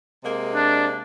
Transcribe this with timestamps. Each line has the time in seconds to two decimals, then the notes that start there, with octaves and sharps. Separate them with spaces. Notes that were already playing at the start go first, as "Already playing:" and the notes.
0.24 C3 G#3 A#3
0.55 D4